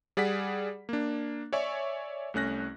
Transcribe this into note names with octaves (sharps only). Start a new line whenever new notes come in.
G3 G#4 D5 F#5 B6
A#3 D4
C#5 D5 E5 G#5 C#6
C2 A3 C#4 F#6 A#6